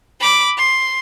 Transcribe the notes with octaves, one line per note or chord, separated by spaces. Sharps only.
B5 D6
C6